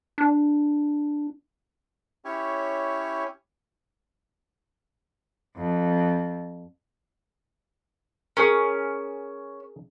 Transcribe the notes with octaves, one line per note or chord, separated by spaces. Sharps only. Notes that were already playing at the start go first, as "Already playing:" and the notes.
D4
C#4 E4 G4 C#5
F2
C#4 G#4 A#4